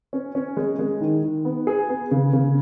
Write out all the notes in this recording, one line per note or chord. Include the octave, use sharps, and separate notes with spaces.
C#4
C#4
G#3
G#3
D#3
D#3
B3
G#4
B3
C#3
C#3